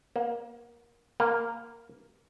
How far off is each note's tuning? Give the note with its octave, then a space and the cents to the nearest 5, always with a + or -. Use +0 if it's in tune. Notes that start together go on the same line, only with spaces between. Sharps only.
A#3 +20
A#3 -5